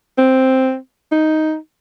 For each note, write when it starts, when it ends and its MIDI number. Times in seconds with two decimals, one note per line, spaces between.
0.18 0.76 60
1.12 1.56 63